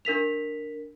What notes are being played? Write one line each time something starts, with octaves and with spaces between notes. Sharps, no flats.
D4 A#4 B6 F7